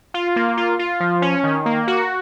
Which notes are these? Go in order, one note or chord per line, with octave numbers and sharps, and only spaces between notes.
F4
A#3
F4
F4
F3
C#4
D#3
A#3
F#4